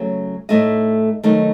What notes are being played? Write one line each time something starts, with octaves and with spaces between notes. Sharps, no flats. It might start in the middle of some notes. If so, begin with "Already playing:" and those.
Already playing: C#3 F#3 A3
A2 A3 D#4 D#5
D#3 F#3 A3 D#4